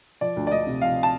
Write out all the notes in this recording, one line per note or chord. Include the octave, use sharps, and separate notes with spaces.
F3 D5
D2
D5
D2 D#5
C3
F3 F5
A5